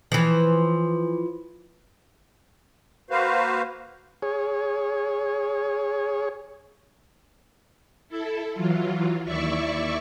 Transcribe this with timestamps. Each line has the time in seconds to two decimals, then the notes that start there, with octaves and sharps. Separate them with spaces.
0.12 E3 F3
3.10 A#3 F#4 B4 C5 F5
4.22 G#4 C#5
8.09 E4 A4
8.54 E3 F#3 F4
9.25 D#2 E4 D5 E5 C#6